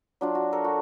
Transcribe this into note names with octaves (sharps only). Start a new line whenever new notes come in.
F#3 D4 F4
F#4
A4 A#4
F#4